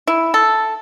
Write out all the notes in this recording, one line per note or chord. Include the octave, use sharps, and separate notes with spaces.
E4
A4